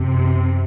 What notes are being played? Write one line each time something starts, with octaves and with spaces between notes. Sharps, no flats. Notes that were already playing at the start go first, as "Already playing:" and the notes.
Already playing: F#2 C3